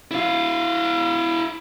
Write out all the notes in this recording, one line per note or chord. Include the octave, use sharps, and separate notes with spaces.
E4 F5